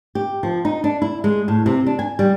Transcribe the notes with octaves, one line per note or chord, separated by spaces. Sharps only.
G4
F3
D#4
D4
E4
G#3
A2
C3
D4
G#5
G3